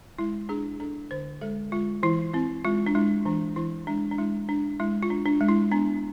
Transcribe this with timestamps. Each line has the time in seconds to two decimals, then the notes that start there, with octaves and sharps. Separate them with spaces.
0.19 G#3 E4
0.49 D4 G#4
0.80 D4 A4
1.11 D3 C5
1.41 G#3 A4
1.72 G#3 F4
2.03 E3 E4
2.33 C4 E4
2.65 G#3 F4
2.86 D4
2.95 G#3 E4
3.25 E3 D4
3.56 E3 E4
3.87 G#3 D4
4.11 D4
4.18 G#3 E4
4.49 D4
4.80 G#3 E4
5.03 F4
5.10 D4
5.26 D4
5.41 G#3
5.49 E4
5.71 B3 D4